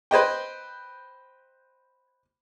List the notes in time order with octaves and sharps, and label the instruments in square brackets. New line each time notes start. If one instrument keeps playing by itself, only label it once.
[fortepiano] B4 C5 D#5 G5